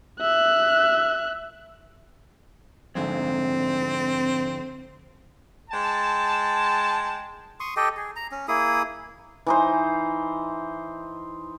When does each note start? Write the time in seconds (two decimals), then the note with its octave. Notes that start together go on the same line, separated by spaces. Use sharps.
0.20 E5 F#6
2.95 F2 G#2 D3 C4
5.71 G#3 G5 A5
7.60 C6 C#6 D#6
7.76 G4 A4 D#5 G5
7.97 G#4
8.16 A#5
8.32 C#4
8.48 A#3 E4 G#4 D#6
9.47 E3 D#4 C5